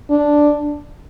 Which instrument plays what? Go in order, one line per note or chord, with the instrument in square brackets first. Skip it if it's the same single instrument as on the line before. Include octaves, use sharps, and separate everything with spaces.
[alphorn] D4